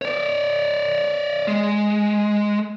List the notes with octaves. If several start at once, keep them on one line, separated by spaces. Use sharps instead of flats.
C#5 D5
G#3